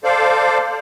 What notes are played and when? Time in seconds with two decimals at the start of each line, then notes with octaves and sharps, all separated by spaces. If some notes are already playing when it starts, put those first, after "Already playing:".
0.04 A4 C5 D5 F5